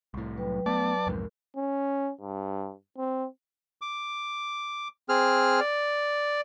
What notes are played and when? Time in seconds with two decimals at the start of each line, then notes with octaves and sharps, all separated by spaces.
0.14 C2 A2
0.36 F#3 B4 G5
0.66 A3 B3 D5 A5
1.07 C2 F2 G#2 A#4
1.56 C#4
2.21 G2
2.98 C4
3.81 D6
5.09 C4 G#4 F6
5.60 D5